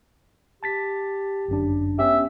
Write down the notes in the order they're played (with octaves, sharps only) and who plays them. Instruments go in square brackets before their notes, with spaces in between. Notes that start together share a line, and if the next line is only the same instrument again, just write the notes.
[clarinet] G4 [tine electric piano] A5 A6 B6
[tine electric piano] G1 F#2 D4
[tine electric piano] B3 C#4 G4 [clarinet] E5